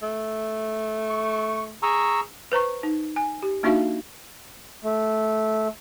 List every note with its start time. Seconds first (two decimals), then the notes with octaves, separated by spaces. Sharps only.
0.02 A3
1.10 C#6
1.83 G#4 A#5 C#6 E6
2.52 B4 C5 A#5 C#6
2.83 D#4
3.16 G#5
3.43 G4
3.63 A#3 D4 D#4 F#4 E5 F5
4.84 A3